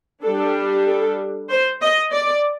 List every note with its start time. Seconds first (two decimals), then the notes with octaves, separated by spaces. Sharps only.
0.24 G3 D4 A4
0.87 A4
1.50 C5
1.82 D#5
2.12 D5